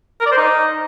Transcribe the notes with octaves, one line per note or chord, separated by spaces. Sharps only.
A#4
D5
C5
D#4